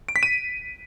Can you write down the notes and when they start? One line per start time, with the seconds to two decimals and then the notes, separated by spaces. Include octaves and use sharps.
0.09 D7
0.16 B6
0.23 D#7